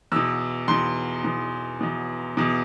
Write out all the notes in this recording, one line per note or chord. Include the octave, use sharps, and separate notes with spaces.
E2 B2 E6
E2 B2 C6
E2 B2
E2 B2
E2 B2